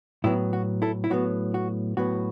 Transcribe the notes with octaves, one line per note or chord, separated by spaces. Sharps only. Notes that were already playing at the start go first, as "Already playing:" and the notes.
A2 F#3 B3 E4
F#4
E4 A4
E4
A2 F#3 B3 F#4
F#4
A2 F#3 B3 F#4